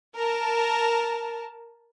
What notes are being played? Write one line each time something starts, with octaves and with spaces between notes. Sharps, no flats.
A#4 A5